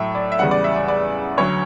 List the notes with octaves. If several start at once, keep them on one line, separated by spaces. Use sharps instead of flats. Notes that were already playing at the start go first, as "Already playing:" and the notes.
Already playing: A2 F#3 A3 E5
D5
E5
E2 C#3 G3 F#5
D5
E5
D5
D5
D2 D3 F#3 C#5